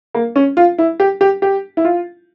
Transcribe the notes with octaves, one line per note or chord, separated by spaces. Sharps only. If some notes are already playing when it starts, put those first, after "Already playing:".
A#3
C#4
F4
E4
G4
G4
G4
E4
F4